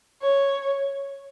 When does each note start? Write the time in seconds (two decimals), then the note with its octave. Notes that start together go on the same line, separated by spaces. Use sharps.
0.22 C#5